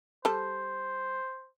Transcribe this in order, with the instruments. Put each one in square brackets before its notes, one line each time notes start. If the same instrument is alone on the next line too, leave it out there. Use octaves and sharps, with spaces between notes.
[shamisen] G3 A4 [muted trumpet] C5